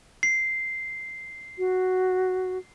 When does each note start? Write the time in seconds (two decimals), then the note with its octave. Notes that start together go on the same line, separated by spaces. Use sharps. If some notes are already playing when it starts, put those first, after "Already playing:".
0.23 C7
1.58 F#4